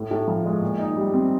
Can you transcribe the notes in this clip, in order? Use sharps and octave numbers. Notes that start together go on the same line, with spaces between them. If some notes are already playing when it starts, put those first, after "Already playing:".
Already playing: A2
A2
F3
G#3
A#2
D#4
G3
C4